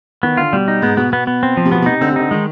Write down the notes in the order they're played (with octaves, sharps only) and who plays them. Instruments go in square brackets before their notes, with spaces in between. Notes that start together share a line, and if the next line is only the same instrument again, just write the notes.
[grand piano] D#3 [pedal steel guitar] B3
[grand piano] D3 [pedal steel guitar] F4
[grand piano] B2 [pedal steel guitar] G3
[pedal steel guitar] D#4
[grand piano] G#2 [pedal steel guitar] B3
[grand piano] B2 [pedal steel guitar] B3
[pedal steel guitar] B3
B3
C4
F3
[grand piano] C3
[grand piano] B2 [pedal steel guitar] B3
[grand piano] B2
[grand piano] C3 [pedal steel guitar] D#4
[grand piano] D3 [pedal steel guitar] C4
[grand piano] C3
[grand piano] D3 [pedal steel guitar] D#4
[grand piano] D#3 [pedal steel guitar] G#3